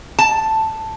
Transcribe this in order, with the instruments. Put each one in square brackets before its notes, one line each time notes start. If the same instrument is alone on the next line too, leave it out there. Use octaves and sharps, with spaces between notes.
[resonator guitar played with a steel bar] A5